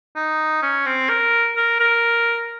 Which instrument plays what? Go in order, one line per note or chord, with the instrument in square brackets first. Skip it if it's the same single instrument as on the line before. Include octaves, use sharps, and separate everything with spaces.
[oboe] D#4
C#4
C4
A#4
A#4
A#4